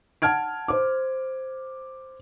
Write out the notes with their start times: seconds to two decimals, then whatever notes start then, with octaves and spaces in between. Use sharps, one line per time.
0.22 F#5 A5 F6 G#6 D7
0.68 C5 D6